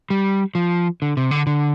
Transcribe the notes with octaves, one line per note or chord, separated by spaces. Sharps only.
G3
F3
D3
C3
D3
D3